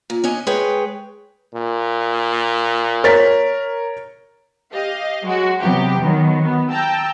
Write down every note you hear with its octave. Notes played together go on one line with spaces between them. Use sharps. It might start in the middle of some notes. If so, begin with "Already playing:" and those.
A#2
C#4 D4 D#5 G#5
G#3 G#4 B4 C#5 G5
A#2
A#4 C#5 A6 B6
G4 D#5 F5
F#3 G#3 F#4
C3 F#3 B3 G4
D#3 F#3 B3
B3
G5 A5 A#5 E6